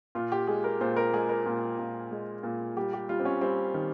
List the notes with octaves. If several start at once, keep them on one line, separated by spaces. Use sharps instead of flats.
A#2 F4
G4
G#3 G#4
A#4
A#2 C5
A#4
G#3 G#4
A#4
A#2
A#2
G#3
A#2
G3 G4
G4
G3 F4
C4
C#4
G3 C4
D#3